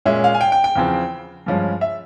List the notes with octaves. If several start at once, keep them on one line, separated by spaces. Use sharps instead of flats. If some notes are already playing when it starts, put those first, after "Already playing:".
A#2 G#3 C#4 E5
F5
G#5
G5
G5
G5
E2 C#3 F3 C4
G2 F3 G#3 C#4
E5